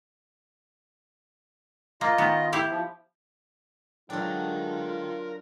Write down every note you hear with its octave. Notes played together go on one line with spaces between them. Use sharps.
A#3 F4 D#5
D#3 B3
E4 G4 F5
F3
F#3 G#3 D4 F4 A4 A#4 G5